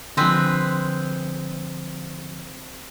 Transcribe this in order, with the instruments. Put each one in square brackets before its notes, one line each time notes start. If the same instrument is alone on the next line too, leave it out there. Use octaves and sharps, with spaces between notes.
[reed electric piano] D3 F3 [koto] G#3 C4 B4